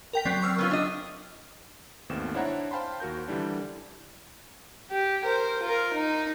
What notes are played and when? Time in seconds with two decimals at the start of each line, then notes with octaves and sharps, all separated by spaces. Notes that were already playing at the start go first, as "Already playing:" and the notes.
0.13 A#4 G5 B6
0.25 F#3 C4 D5
0.42 C#6 E6 F6
0.59 B3 C#4 F4
0.71 D4 D#5
2.09 G#1 D#2 B2 A3 C4 E7
2.34 D4 E4 C5 C#5 F#5 A#5
2.71 C5 F5 G5 A5 B5 C6
3.00 D#2 F#4 A#4 G6
3.28 D3 E3 G3 D4
4.90 G4
5.24 A#4 C5
5.62 F4 A#4
5.94 D#4